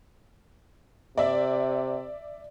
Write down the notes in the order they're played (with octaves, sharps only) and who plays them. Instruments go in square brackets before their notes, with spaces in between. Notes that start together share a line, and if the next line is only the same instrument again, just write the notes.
[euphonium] C3 [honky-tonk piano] D5 E5